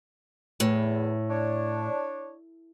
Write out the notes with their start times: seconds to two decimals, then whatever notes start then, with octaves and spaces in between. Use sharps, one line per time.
0.60 E2 A2
1.30 D4 C#5